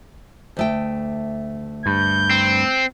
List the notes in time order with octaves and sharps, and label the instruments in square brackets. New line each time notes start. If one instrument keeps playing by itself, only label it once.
[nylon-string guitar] D2 A3 G5
[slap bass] G2 [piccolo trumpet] G6
[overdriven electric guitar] C4